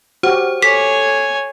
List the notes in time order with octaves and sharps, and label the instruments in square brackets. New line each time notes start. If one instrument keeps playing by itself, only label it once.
[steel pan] F#4 G4 [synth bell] C5
[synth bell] A4 [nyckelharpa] C#5 G#5 [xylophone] B6